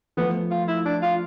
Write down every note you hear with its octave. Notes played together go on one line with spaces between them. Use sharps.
F3 A3 B3
F4
E4
D4
F4